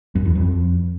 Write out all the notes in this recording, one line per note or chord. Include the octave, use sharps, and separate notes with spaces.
F#2
E2
F2